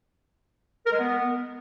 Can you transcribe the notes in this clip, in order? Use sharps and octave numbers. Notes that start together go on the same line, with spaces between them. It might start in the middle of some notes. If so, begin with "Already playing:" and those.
A#4
G#3
B3